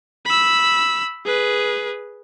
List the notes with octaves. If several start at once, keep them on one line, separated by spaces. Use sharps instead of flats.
B5 E6
G#4 B4